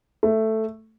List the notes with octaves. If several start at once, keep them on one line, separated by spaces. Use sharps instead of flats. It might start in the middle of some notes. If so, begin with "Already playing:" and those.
A3